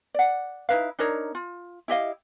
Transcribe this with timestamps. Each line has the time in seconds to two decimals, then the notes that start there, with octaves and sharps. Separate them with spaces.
0.14 D5 F#5
0.69 D#4 E4 B4 F5
0.99 D4 D#4 A#4 C#5
1.35 F4
1.88 E4 G4 D#5 F5